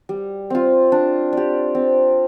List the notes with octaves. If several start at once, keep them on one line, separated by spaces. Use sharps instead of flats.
G3
C4 F4
D4
G4 D5
C4